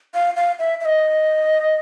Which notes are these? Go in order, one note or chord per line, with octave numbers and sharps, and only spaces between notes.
F5
F5
E5
E5
D#5